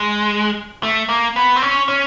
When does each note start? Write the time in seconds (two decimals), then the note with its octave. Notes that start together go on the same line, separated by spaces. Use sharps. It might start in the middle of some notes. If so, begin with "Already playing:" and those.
Already playing: G#3
0.83 A3
1.09 A#3
1.36 B3
1.56 C4
1.62 C#4
1.88 C#4